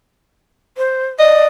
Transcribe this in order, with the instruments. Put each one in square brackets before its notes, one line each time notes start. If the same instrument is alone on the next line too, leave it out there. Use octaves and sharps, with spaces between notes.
[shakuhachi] C5
[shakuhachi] D5 [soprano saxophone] D#5